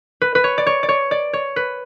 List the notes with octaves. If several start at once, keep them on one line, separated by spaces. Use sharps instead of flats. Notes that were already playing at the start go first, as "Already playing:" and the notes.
B4
B4
C#5
D5
C#5
D5
C#5
D5
C#5
B4